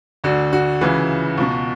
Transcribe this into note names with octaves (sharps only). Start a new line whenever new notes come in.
D2 D3 F#4
F#4
C#2 C#3 E3
C#2 B2